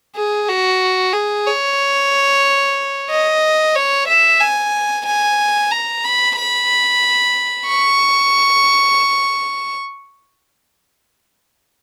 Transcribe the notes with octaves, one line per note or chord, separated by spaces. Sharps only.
G#4
F#4
G#4
C#5
D#5
C#5
E5
G#5
G#5
A#5
B5
B5
C#6